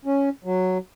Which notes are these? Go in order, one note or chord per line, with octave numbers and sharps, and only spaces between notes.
C#4
F#3